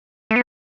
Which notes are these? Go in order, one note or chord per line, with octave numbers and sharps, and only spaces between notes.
A3
B3